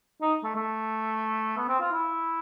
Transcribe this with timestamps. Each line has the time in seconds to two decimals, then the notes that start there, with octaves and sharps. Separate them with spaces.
0.22 D#4
0.44 A3
0.56 A3
1.58 B3
1.69 C4
1.80 F4
1.92 E4